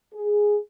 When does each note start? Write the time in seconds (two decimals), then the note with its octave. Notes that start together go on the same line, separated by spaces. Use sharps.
0.15 G#4